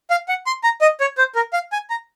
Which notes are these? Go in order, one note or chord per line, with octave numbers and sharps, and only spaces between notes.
F5
F#5
C6
A#5
D#5
C#5
C5
A#4
F5
G#5
A#5